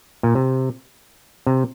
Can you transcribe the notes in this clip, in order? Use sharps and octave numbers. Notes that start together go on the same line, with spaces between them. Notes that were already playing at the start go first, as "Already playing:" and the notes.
A#2
C3
C3